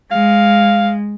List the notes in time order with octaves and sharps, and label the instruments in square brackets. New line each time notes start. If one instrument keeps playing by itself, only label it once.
[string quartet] G#3 [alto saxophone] F5